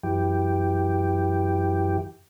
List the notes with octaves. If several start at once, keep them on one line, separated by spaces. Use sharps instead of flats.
F#2 E3 G4